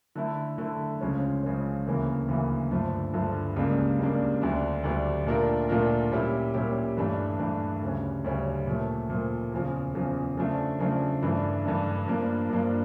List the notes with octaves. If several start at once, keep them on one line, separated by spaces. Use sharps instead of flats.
D3 A3 E4
D3 A3 E4
C#2 C#3 F3 C#4
C#2 C#3 F3 C#4
D2 C#3 E3 A#3
D2 C#3 E3 A#3
G2 D3 F3 A3
G2 D3 F3 A3
C#2 C#3 G3 A#3 D4
C#2 C#3 G3 A#3 D4
D2 D3 G3 D4
D2 D3 G3 D4
A#2 A3 D4 F4 A#4
A#2 A3 D4 F4 A#4
A#2 G3 C#4 E4 G4
A#2 G3 C#4 E4 G4
G2 E3 A3 D4
G2 E3 A3 D4
D2 C#3 G3 C#4
D2 C#3 G3 C#4
A#2 F3 A3
A#2 F3 A3
E2 C#3 F3
E2 C#3 F3
C#3 F3 A3 D4
C#3 F3 A3 D4
G2 E3 A3 D4
G2 E3 A3 D4
G2 F3 A#3 D4
G2 F3 A#3 D4